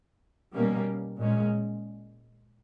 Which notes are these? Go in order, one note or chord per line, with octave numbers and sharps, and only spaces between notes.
B2 G3 A#3 C#4
A#2 G#3 C#4